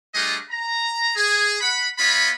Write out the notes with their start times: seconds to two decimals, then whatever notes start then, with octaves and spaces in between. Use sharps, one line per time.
0.14 G3 A3 D4 F4 G#4 D#5
0.50 A#5
1.16 G#4
1.60 F#5 B5
1.98 B3 F4 C#5 D#5 B5